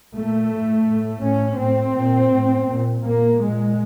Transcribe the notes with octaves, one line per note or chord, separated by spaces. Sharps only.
A#2 A3
A2
A2
A2 C#4
A2 C4
A#2
A2
A#2
A#2 A#3
A#2 G#3